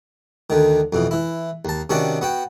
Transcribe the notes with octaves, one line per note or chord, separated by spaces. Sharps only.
D2 D3 D#3
F2 B2 E3
E3 E4
D#2 A5
C3 D#3 C#4 D4 F#4 D5
B3 F#4 G5